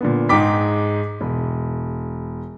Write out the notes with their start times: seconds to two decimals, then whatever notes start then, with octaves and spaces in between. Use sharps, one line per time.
0.01 A#2 D3 B3
0.29 G#2 G#3 D#4 G5 D6 B6
1.21 E1